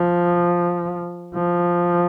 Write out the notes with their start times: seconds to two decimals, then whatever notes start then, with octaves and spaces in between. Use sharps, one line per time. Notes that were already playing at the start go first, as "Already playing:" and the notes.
Already playing: F3
1.35 F3